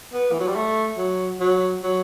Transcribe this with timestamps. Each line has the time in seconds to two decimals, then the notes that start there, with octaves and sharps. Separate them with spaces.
0.13 B3
0.32 E3
0.40 F#3
0.47 G3
0.56 A3
0.98 F#3
1.41 F#3
1.83 F#3